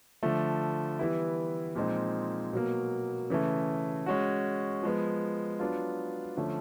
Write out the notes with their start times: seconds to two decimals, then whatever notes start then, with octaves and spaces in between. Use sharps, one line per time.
0.23 D3 F3 A3
0.99 E3 G3 B3 E4
1.75 A#2 F3 G#3 C4 D#4
2.53 B2 F#3 A#3
3.30 C#3 E3 A3
4.06 G#3 C#4 F#4
4.83 F3 G#3 B3
5.60 F#3 B3 D4 F4
6.37 D3 F3 A3 C#4